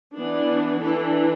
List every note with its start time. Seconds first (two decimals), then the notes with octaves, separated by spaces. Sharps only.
0.14 E3 B3 D4
0.80 E3 D4 A4